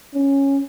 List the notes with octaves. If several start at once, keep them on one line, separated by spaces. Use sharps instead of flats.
C#4